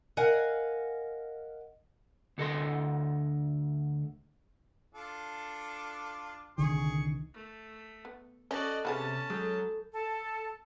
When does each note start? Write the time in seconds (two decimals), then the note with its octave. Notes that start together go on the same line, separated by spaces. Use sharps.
0.17 A#4 D#5 F5 F#5 G#5
2.38 D2 A4 D#5 C6
4.94 D4 F4 A4
6.58 C2 D3 D#3 G#4 C#6
7.33 A3
8.05 B3
8.51 C#4 F#4 A4 C5 D5 D#5 A5
8.85 C3 B3 C#4 F#4 G#4 A5 B5
9.30 F#3 G#3 A4 D#6 G6
9.93 A4 A5